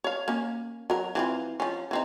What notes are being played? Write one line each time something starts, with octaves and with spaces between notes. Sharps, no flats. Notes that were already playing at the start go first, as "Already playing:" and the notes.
C#5 F5
A#3 C#4
F#3 A#4
E3 C4 F4
F3 C#4
E3 C4 D#4